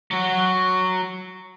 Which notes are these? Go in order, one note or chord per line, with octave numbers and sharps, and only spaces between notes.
F#3 F#4